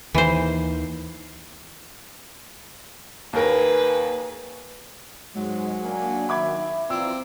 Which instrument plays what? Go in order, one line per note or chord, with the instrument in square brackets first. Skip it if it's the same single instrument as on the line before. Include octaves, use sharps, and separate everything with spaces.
[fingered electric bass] D#2 D#3 [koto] E3 C5
[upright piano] D#2 A#4 [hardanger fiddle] G#4 B4
[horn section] G#2 [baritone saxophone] F#3 [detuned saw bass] G#3
[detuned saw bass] A#3 [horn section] D4 G#5
[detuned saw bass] D#3 [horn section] E5 [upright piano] B5 D6 G#6
[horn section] E3 D5 A#5 [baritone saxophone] C4 [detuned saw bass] F4 [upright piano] E6